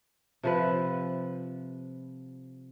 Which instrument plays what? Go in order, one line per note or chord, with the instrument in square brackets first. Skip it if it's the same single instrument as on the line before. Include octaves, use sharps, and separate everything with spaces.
[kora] C3 F3 B4